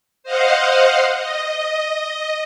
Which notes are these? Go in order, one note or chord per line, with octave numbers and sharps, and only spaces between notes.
C5 D#5 F5 F#5
D#5